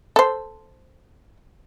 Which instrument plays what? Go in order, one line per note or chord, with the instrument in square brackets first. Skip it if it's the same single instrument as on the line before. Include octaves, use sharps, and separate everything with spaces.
[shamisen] A4 C5